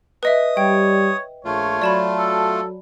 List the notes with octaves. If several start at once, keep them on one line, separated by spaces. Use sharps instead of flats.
B4 D#5 E5 D#6
G3 C#5 G5
A#1 A3 F4 C#5
F#3 D5 A5 B5
A4